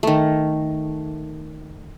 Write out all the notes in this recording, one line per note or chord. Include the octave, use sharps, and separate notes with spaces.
D#3 A3